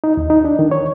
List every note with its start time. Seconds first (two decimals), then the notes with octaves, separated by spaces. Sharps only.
0.04 D#4
0.17 D#2
0.30 D#4
0.45 D4
0.59 D#3
0.71 C#5